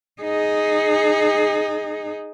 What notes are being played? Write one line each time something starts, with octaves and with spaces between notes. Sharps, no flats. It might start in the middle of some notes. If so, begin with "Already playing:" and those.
D#4 G#4